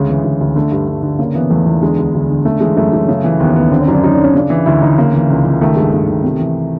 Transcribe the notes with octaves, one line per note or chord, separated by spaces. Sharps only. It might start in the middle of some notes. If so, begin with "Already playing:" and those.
Already playing: D2 C#3 G#3
E3
D2
D2
D3 A3
G2
G2
D3
C#3 A#3
E3 B3
E2 A3
E2
D3 G#3
D2
D2
D3
C#3 A3
E3 G#3
F#2 A3
F#2
C#3
E3
D#2 B3
D#2 B3
D3 C4
C#4
F#2 D4
F#2 D#4
D4
D3 C#4
C#3 D4
E3
D2 E4
D2 D#4
C#3 A#3
E3
C#2
C#2
D#3 A3
G2 G#3
G2 A3
D#3
C3
E3